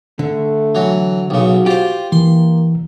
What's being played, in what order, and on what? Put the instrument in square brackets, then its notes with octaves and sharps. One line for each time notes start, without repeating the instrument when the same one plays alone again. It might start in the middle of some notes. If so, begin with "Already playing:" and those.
[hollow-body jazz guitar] D3 [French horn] A3
[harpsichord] E3 F#3
[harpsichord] B1 C#3 [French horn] F#4
[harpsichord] F4 C5 [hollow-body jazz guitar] G4
[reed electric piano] E3 [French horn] A#3 [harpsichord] C6